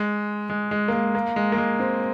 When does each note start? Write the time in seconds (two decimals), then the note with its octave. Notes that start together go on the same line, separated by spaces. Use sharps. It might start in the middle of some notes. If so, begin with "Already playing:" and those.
Already playing: G#3
0.50 G#3
0.71 G#3
0.88 A#3
0.93 G#3
1.15 A#3
1.36 G#3
1.52 A#3
1.58 G#3
1.79 C4